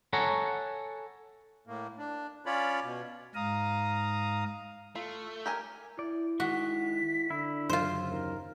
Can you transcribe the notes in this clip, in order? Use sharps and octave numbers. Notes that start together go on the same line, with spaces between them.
A4 C#5 F#5 G#5 A#5
A2 A#3
D4
C#4 F4 C#5 D5 B5
B2
G#2 F5 A#5 D#6
A3 F4
G4 A#4 G#5
E4 D5
D#3 G#3 F#4 B6
D3 E4
F#2 C#3 F4 C5
D#2 A#4